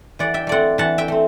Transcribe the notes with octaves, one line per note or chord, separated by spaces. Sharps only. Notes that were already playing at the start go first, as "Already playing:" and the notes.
E3 D5 F#5
E5 G5
A3 C4 D5 F#5
E3 F#5 A5
E5 G5
A3 C4